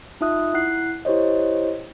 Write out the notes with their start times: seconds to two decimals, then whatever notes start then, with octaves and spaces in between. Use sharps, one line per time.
0.21 D#4 F4 E5 D#6 F#6
0.54 E4 F#5 F#6 C7
1.05 E4 G4 C5 C#5 D#5